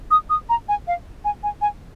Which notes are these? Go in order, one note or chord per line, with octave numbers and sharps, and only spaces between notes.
D#6
D#6
A#5
G#5
F5
G#5
G#5
G#5